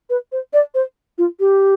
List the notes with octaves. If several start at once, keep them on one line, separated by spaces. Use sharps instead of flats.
B4
C5
D5
C5
F4
G4